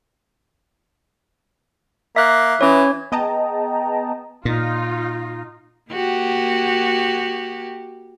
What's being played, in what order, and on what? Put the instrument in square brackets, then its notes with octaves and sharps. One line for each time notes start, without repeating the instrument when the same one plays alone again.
[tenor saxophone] A#3 [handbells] E5 F#6
[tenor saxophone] E3 [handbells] C#4 C#5
[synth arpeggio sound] B3 G#4 D#5 G5 A5 A#5
[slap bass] A#2 [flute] D#4 [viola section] F4
[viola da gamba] A#3 F#4 G4